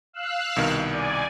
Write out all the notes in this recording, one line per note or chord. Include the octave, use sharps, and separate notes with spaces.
F5 E6 F#6
C2 B2 D#3
D5 G#5